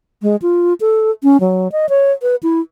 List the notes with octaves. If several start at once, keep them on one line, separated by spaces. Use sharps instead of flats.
G#3
F4
A4
C#4
F#3
D#5
C#5
B4
E4